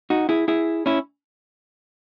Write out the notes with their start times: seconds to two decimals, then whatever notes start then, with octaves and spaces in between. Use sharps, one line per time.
0.10 D#4 F#4
0.29 E4 G#4
0.48 E4 G#4
0.86 C#4 E4